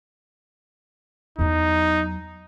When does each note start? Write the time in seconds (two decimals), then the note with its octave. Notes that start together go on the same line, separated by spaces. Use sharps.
1.39 E2 F#3 D#4